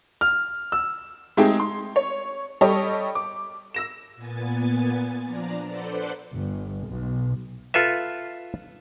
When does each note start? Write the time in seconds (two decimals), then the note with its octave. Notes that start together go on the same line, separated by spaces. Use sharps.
0.21 F6
0.72 E6
1.37 G#3 A3 C4 D#4 G4 G#4
1.60 C6
1.96 C#5
2.61 G3 G4 A4 C#5 D#5
3.15 D6
3.74 E6 A#6 E7
4.15 A#2 B3 G#5 A6
5.24 F3 D4 D5 A#5
5.67 A4 B4 C5 D5 F#5 C6
6.32 G1
6.88 B1
7.74 F4 A4 B4 E5